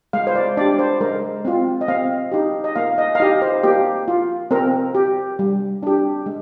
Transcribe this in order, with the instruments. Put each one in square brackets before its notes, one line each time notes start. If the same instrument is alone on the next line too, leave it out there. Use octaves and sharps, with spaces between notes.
[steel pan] G#3 F5
C5
D5
D4 G4 D5
C5
G#3 A#4
C4 F4
D#5
C4 F5
D#4 G4
D#5
A#3 F5
D#5
F5
D#4 G4 D#5
C5
A#3 G4
F4
C4 A#4
G4
G3
D4 G4
G#3